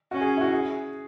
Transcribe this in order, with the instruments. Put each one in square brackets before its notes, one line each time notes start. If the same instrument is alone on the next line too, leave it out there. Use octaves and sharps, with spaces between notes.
[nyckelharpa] C#4 [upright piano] F#4
[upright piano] G#4
E4
F#4
G#4